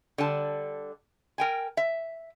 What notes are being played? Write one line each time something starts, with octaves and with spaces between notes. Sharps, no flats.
D3 G3 A5
A#4 G5 G#5
E5